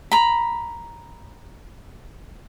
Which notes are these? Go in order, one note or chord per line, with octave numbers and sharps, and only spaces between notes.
A#5 B5